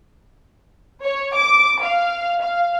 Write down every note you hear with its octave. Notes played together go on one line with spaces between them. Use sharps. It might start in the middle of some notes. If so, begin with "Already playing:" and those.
C#5
D6
F5
F5